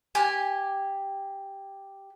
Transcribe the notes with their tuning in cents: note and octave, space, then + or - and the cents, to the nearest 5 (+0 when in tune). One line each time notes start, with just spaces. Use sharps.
G4 +0 G#5 -15